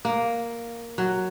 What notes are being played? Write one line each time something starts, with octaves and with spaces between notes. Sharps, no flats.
A#3
F#3